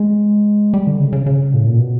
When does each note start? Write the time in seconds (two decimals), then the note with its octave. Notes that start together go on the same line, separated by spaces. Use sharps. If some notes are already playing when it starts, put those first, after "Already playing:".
Already playing: G#3
0.74 G3
0.87 D3
1.00 C#3
1.13 C#3
1.26 C#3
1.54 A2
1.66 A#2
1.79 B2